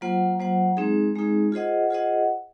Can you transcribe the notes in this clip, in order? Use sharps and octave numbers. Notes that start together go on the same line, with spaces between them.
F#3 A#3 F4 C5 F#5
F#3 A#3 F4 C5 F#5
G#3 C4 D#4 G#4
G#3 C4 D#4 G#4
F4 G#4 C5 D#5 F#5
F4 G#4 C5 D#5 F#5